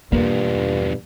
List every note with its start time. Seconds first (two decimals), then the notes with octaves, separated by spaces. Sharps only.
0.12 E2 G2 B2 F3 A#3